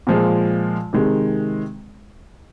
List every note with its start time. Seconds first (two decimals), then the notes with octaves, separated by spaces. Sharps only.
0.07 A#2 F3 G#3
0.93 C3 D#3 G#3